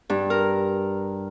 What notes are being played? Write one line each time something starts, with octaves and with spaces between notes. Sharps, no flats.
G2
A#4